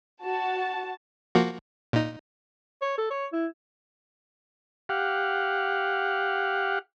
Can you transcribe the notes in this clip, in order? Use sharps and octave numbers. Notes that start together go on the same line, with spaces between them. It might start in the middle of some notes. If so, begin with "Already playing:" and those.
F#4 A5
F3 A#3 F#4
A#2 D#4
C#5
A4
C#5
E4
G4 F5 F#5